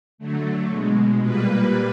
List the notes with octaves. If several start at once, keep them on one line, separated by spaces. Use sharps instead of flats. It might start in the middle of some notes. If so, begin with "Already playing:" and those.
D3 F#3 A3
B2 G#3
A#2 G3 A#3 B4